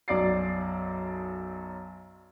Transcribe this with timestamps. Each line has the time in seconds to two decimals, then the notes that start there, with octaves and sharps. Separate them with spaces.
0.08 B1 F#2 D5 D6 A6 C7